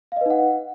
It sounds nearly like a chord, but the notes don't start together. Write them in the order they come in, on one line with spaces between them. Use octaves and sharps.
F5 D#5 B4 D#4 F#5